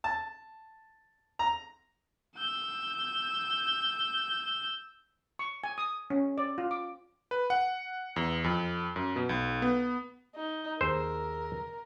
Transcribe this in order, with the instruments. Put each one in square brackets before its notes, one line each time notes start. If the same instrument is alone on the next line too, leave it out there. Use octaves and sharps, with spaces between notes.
[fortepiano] A5
A#5
[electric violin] E6 G6
[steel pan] C#6
G#5
D#6
C#4
D5
F4
D6
[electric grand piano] B4
F#5
E2
F2
F#2
B2
B1
B3
[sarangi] D#4
[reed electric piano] D#2 G#4 E6 [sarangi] A#4 [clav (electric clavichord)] C5